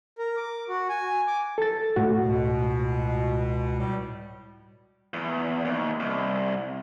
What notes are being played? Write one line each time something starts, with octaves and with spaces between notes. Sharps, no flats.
A#4
D6
F#4
G#5
D6
A4 A6
A2 F#4
C#2 B2
A2 G3
E2
D#2
C2